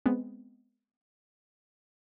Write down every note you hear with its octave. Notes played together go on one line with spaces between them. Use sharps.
G#3 B3 C4